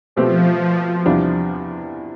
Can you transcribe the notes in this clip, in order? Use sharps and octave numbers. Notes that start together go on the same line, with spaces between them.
B2 F3 A3 C4 G4
E2 C3 G3 D4 F4